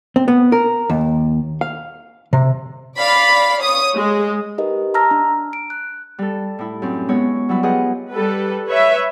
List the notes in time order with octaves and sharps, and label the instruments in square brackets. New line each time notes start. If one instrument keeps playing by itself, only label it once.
[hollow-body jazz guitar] C4
B3
A#4
D#2
F5
C3
[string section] D5 F5 B5
C#5 D#6
G#3
[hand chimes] D#4 G4 A#4 B4 D#5
A5 A#5 E6 F6 A#6
D4
D7
F#6
[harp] G3 A4
A2 E4
F#2 C4
G#3 B3 E4 C#5
F#3 G3 E4 B4
F4 G4 G#4 B4 D#5 F#5
[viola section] G3 A4 B4
B4 C#5 E5